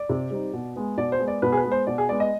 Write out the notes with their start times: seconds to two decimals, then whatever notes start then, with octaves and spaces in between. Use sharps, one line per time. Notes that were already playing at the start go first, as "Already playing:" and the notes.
Already playing: D5
0.09 C3
0.31 G3 C4 D#4
0.53 B2
0.76 G#3 B3
0.98 B2 D5
1.12 C5
1.20 G#3 B3
1.28 D5
1.42 B2 B4
1.52 G#4
1.57 B4
1.65 G#3 B3
1.72 C5
1.87 B2 D5
1.98 G#4
2.09 G#3 B3 D5
2.20 D#5